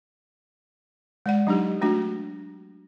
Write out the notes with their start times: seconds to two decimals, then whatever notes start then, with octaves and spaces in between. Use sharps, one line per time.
1.26 G#3 D5 F#5
1.47 F#3 D4 D#4 G4
1.81 A3 D4 F#4